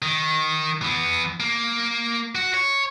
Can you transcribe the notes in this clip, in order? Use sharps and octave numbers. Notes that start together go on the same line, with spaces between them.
D#3
E3 B3
A#3
F#4
C#5